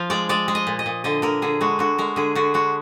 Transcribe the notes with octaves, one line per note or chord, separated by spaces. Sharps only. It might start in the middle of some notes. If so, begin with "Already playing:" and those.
Already playing: F3 F5
G#3 D5
G#3 D5
G#3
D#5
A#2
D#5
A#2
D3 D#5
D3 A#4
D3 G#4
G#3 F#4
D3 F#4
G#3 A#4
D3 G#4
D3 F#4
G#3 F#4